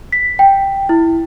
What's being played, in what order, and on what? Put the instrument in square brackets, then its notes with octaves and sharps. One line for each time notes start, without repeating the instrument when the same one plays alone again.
[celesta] B6
G5
E4